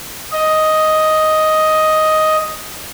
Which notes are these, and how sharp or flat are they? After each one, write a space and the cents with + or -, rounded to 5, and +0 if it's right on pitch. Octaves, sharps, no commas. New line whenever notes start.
D#5 +5